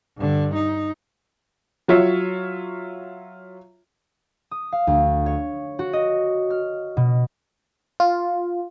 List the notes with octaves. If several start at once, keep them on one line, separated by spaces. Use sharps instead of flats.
G2 D3
D#4
F#3 F4 C#5 E5
D#6
F5
D2
C#5
F#4
D#5
F6
B2
F4